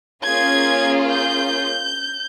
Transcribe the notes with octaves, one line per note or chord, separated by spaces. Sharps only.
A#3 C#4 F4 G#4 G#6
G6